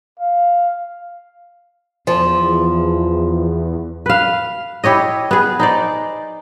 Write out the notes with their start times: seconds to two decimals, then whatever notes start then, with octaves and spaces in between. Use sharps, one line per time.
0.19 F5
2.07 E2 F3
4.06 B4 F5
4.84 E4 G4 C#5 D#5
5.31 B3 G#4
5.59 D#4 C5 D5